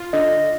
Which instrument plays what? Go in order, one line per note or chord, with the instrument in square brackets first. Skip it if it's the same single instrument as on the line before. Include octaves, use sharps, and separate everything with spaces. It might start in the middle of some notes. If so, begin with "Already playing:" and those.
Already playing: [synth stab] F4
[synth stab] D3 [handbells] D#5